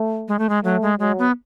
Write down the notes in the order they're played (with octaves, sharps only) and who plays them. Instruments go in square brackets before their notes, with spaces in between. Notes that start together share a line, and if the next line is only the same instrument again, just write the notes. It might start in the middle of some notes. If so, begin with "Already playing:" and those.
Already playing: [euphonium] A3
[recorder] G#3
A3
G#3
[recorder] F#3 [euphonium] A3
[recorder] G#3
[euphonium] F#3 [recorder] G#3
[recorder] B3